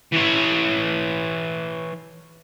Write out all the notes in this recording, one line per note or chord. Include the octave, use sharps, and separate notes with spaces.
E3 C#5